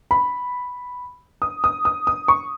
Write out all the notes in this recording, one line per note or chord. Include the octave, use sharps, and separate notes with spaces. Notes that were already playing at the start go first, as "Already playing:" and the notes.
B5
D#6
D#6
D#6
D#6
C#6